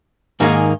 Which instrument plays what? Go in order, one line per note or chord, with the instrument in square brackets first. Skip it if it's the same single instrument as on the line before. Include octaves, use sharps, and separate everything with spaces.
[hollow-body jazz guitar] G#2 D#3 A#3 D#4 G#4